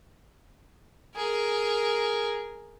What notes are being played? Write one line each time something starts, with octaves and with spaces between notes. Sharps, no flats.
G#4 A#4